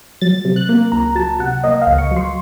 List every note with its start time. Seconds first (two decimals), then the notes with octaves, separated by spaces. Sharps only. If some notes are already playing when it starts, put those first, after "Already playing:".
0.21 F#3 A6
0.45 C3
0.56 F#6
0.69 A#3
0.92 C#2 A#5
1.15 F#3 A5
1.40 C3 F#5
1.64 A#3 D#5
1.82 F5
1.87 C#2
1.98 C#6
2.11 F#3
2.16 C6